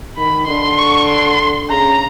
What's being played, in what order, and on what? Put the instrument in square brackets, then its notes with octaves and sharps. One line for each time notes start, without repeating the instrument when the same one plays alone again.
[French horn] D#3 [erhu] B5
[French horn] D3 [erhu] C6
[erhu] C#6
C6
[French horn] C#3 [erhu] A#5